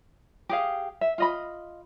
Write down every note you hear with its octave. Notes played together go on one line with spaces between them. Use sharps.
G4 G#4 F5
E5
F4 D#5 B5